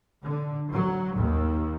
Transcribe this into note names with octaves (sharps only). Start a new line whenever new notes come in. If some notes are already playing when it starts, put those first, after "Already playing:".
D3
F#3
D#2